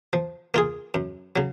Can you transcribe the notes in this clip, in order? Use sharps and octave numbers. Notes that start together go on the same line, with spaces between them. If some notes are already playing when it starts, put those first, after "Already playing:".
F3
A#3 F4 G#4
F#2
C#3 F#3